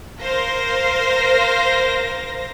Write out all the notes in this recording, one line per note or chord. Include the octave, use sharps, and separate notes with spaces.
A#4 C5 F5 A#6